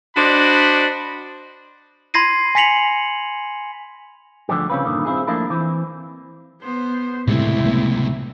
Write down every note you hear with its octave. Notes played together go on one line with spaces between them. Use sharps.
D4 F#4 C5 D5 D#5 B5
B5 C6 G#6 A#6 C7 D#7
G#5 A#6 B6 C#7 F7 F#7
D2 D3 F3 G3 G4
C#3 C4 C#4 F4 B4
G2 A#2 D3 D#3
C4 E4 F4 G#4
F3 A3 A#3 D4 E4 F4
E3 C4
B3 C5
C#2 A2 C3 G3 A3 C4 E4
F#3 A3 B3